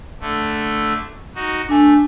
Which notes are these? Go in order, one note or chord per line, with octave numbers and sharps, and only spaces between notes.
D3 A3
D#4 F#4
A3 D4 G#5